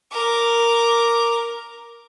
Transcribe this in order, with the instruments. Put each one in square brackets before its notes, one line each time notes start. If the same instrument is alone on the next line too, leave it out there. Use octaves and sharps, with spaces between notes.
[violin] A#4 D6